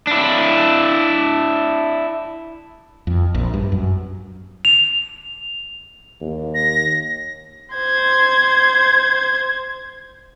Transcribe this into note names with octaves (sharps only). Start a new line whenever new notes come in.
D4 E4
F2
A#1
G2
F#2
F7
D#2
A#6
C5 G#6